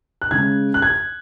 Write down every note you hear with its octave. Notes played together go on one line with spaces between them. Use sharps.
F#6
C#3 G#3 G#6
F#6
G#6